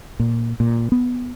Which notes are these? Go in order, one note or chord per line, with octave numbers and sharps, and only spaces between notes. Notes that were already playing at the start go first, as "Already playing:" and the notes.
A#2
A#2
B3